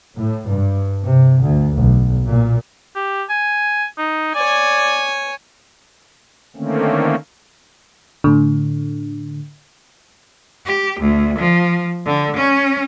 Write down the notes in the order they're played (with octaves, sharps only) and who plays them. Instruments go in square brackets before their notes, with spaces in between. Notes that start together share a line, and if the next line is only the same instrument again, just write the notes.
[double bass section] A2
G2
C3
D2
B1
A#2
[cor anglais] G4
G#5
D#4
[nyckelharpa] C#5 G#5 [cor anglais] D5
[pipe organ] D3 D#3 A3 A#3 C4 C#4
[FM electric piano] A2 D3
[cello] G4
D2
F3
D3
C#4